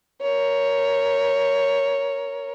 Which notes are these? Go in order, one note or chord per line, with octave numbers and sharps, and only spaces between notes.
A#4 C#5